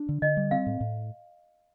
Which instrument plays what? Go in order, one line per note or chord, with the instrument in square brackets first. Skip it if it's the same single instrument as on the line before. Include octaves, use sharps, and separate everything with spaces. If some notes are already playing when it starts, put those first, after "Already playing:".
Already playing: [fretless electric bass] D4
D3
[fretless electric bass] D3 [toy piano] D#5
[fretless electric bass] G3
[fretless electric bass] C4 [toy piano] F5
[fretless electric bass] A2
A2